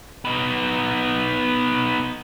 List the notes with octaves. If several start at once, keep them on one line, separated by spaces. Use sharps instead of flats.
B3 D#4